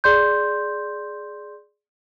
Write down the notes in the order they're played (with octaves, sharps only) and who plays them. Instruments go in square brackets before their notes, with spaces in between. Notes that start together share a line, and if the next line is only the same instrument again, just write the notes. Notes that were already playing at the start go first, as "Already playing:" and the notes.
[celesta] G#4 D5 C6 G6